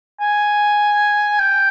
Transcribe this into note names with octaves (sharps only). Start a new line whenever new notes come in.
G#5
G5